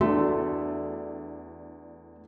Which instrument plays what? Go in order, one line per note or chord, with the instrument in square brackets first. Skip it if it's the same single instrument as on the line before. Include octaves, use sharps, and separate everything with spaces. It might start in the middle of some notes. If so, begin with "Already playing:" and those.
[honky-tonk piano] E2 D4 [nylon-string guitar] A3 [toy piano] F#4